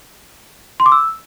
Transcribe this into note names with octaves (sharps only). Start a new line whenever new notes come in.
C6
D6
E6